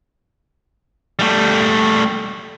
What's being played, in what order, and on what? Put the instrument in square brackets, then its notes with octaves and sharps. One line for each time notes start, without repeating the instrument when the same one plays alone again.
[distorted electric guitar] G3 A3